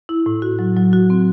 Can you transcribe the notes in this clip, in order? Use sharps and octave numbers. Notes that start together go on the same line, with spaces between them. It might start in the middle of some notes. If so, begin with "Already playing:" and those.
E4
A2
F#4
F#3
F#3
F#4
C4